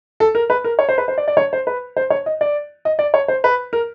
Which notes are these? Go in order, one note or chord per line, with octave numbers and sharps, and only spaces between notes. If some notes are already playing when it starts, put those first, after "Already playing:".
A4
A#4
B4
A#4
C#5
C5
B4
C5
D5
D5
C#5
C5
B4
C5
C#5
D#5
D5
D#5
D5
C#5
C5
B4
A#4